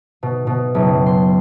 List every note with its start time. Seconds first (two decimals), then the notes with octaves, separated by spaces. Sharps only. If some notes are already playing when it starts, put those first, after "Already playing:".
0.23 B2
0.47 B2
0.75 F#1
1.06 C6